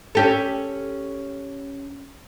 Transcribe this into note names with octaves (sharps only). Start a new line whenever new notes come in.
C#4 G4 A4